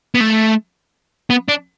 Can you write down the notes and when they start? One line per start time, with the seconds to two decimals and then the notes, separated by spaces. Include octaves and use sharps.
0.15 B3
0.21 A3
1.30 B3
1.48 D4